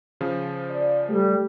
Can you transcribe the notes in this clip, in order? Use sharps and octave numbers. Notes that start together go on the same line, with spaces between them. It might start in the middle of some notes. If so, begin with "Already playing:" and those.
C#3 F3
D5
G3 A3 G4